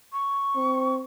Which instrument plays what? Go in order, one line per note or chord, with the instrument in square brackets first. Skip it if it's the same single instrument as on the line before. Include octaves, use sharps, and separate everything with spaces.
[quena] C#6
[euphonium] C4